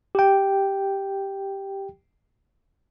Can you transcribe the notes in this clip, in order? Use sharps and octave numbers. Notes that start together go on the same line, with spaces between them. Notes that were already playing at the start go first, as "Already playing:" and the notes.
G4 G5